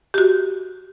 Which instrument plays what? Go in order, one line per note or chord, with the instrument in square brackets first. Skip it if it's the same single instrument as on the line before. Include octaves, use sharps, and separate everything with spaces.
[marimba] F#4 G4